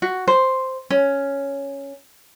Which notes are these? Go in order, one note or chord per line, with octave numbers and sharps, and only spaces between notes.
F#4
C5
C#4